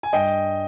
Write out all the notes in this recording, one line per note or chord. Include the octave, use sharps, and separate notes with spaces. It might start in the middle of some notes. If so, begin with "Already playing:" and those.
G#5
G2 D#5 G5